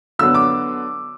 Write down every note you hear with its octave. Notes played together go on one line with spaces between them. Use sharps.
D3 F#3 B3 E6
D6